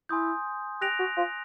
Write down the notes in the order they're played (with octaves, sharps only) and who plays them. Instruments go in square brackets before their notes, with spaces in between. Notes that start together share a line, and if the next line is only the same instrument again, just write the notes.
[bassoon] E4 [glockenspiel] G#5 C6 D#6 G6
[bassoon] G4 [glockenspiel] F#6 A#6 D7 F7
[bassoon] F#4
F4